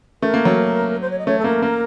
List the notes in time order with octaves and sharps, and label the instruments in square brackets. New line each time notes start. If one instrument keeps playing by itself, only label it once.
[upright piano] A3 [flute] A#4
[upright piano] A#3
F#3
[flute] C5
C#5
D#5
[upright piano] A3 [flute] C#5
[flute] A4
[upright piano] A#3 [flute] A#4
[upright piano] A#3